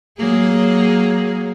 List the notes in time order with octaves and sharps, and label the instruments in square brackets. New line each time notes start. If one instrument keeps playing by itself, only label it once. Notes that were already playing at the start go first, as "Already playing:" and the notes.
[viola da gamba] F#3 A#3 G#4